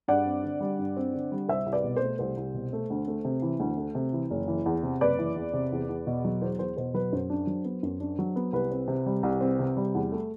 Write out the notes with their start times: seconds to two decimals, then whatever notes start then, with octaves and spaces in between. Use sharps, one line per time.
0.08 G2 D5 F#5
0.26 C4
0.44 D3
0.60 G3
0.79 G2
0.97 C4
1.14 D3
1.32 G3
1.49 C2 C5 E5
1.66 C2
1.73 B4 D5
1.84 B2
1.96 C5
2.02 A3
2.19 C2 C5
2.37 C2
2.54 B2
2.73 A3
2.90 D2
3.08 A3
3.25 C3
3.42 E3
3.60 D2
3.77 A3
3.95 C3
4.13 E3
4.31 F#1
4.48 E3
4.66 E2
4.83 C3
5.01 F#1 B4 D5
5.19 E3
5.36 E2
5.53 C3
5.72 E2
5.89 E2
6.07 B2
6.25 F#3
6.42 E2 C5
6.59 E2 C5
6.77 B2 C5
6.94 F#3 B4
7.12 F#2 C5
7.30 D4
7.47 F#3
7.65 B3
7.83 F#2
8.00 D4
8.19 F#3
8.36 B3
8.53 C2 B4
8.71 C4
8.88 C3
9.06 G3
9.23 C2
9.41 C4
9.59 C3
9.77 G3
9.95 E2
10.12 A3